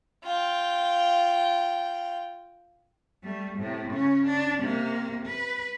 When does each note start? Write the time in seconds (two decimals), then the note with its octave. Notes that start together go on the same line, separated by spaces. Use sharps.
0.23 F4 G5
3.24 G3 A3
3.58 A2 C3
3.92 C#3 C#4
4.27 D4
4.60 C3 A#3
5.26 B4